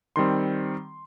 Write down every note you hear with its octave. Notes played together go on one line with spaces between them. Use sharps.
D#3 G3 C4 C6